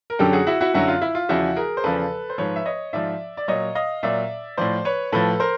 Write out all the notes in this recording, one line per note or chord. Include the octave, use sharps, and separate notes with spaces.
A#4
F#2 D3 F#3 G4 A4
F#4 G#4
E4 F#4
E4 F#4
F#2 D3 F#3 E4 F#4
F4
E4
F4
E2 C#3 F3 E4 F#4
G#4 A#4
C5
E2 C#3 F3 A4 B4
C5
G#2 F3 B4 C#5
E5
C#5 D#5
G#2 F3 D5 E5
D5
A#2 F#3 C#5 D#5
D#5 F5
A#2 F#3 D5 E5
A2 F3 C5 D5
B4 C#5
A2 F3 A4 B4
A#4 C5